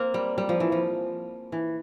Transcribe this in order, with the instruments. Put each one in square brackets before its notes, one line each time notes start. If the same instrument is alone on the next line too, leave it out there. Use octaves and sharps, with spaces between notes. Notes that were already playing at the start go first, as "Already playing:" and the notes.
Already playing: [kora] A#3 C4
G3
G3
F3
E3
F3
E3